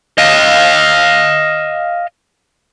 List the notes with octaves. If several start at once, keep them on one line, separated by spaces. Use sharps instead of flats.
D#5 F5